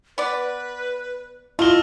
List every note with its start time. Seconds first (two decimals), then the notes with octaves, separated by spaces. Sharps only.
0.18 B3 B4 D5
1.59 A3 E4 F4 D#5 G7